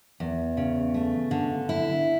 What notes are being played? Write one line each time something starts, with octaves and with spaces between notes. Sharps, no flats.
E2
C#3
A3
D3
E4